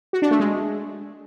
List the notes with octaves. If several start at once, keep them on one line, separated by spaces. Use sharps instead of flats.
F#4
D4
A3
G#3